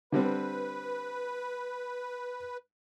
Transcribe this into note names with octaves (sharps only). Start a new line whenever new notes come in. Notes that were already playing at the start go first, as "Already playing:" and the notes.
D3 G3 C4 B4